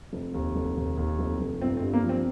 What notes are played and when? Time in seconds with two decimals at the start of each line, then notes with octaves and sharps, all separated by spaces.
0.13 F1
0.34 D#2
0.55 F1
0.77 D#2
0.98 D#2
1.19 F1
1.40 F1
1.61 G1 C4
1.77 C4
1.82 G2
1.93 A#3
2.03 F3
2.09 C4